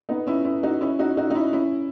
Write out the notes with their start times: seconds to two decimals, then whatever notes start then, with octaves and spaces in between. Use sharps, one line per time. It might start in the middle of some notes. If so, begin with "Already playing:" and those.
0.09 B3 D#4
0.27 C#4 E4
0.44 C#4 E4
0.63 D#4 F#4
0.81 C#4 E4
0.99 D#4 F#4
1.17 D#4 F#4
1.30 D#4
1.35 C#4 E4
1.53 C#4 E4